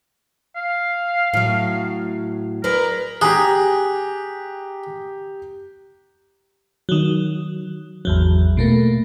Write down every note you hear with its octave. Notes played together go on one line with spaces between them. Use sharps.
F5
A2 F#3
G#4 A#4 B4 D5
G4 G#4 A#5 F#6
D#3 F#3
G#1 E2 F#3
B2 A3 A#3